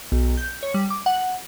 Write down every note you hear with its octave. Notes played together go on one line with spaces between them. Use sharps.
B1
G6
C#5
G3
D6
F#5